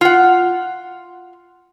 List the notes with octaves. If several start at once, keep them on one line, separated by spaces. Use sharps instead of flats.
F4 F#5